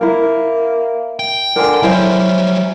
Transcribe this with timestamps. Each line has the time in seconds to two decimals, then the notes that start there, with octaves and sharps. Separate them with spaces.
0.01 A#3 E4 A#4
1.19 G5
1.56 D3 A#4 C5 G#5
1.83 F#3 G3 C#4 E4 C5 F5